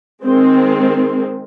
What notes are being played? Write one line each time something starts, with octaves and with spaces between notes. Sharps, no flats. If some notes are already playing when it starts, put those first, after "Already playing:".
D#3 G#3 C4